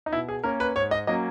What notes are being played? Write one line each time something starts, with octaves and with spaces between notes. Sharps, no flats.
D#4
B2 E4
G#4
A#3 C#4 A#4
B4
G#2 C#5
D#5
F#3 A#3 C#4 D#5